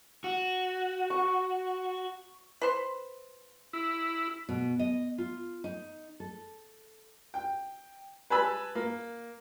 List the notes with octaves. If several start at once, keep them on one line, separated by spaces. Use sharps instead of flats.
F#4
C#6
B4 C5
E4
B2
D#5
F4
D#4
A4
G5
B4 G#5 A5 B5 E6
A#3